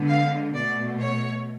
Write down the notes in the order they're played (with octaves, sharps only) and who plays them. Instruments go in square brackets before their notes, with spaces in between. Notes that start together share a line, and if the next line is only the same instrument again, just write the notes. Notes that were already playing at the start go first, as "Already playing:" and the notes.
Already playing: [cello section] D3 G#3 B3
F5
B2 A3 D5
C#5